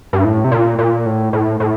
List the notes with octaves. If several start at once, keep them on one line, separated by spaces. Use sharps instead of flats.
G2
A2
C3
A#2
A#2
A2
A2
A2